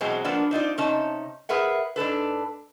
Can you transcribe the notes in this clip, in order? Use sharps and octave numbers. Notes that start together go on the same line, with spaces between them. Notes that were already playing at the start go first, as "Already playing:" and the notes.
B2 E3 F#3 G#3 C4
F3 A#3 B3 D4
C4 D#4 F4 D5
C3 C#4 D#4 A5
G#4 A#4 B4 E5 F#5
G#2 D4 A4 B4